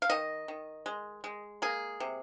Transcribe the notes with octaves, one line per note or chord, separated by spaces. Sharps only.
F5
D#3 D#5
D#3
G#3
G#3
A#3 G#4
C3